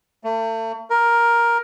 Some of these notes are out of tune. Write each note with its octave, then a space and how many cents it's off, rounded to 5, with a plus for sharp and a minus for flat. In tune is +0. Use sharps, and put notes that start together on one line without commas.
A3 +35
A#4 +10